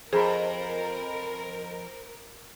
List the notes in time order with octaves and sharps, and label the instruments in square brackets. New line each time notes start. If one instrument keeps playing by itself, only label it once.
[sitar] F2 [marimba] G#4 [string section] A#4 [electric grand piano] C5 A#5 B5